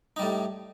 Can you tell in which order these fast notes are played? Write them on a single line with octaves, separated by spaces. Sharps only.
D#4 G3 A2